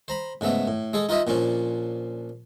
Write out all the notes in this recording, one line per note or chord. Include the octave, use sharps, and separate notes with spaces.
C5 A#5 B5
G#2 C#3 A3 B3 E5
A2
G#3 G#4 A4
D#4 F4 B4 D#5 E5
A#2 F3 C#4 D4